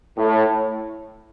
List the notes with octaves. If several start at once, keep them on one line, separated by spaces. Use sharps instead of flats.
A2